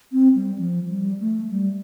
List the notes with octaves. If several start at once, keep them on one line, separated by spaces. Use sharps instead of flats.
C4
G3
F3
G3
A3
G3